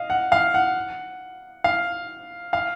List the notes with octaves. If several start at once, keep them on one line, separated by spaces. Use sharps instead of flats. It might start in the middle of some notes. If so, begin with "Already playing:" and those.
Already playing: D#5 F5
F#5
F5
F#5
F5
F5